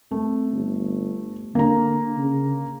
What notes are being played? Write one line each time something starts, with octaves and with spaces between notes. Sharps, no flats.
A3 C4
G1
D3 A#3 A#5
C#3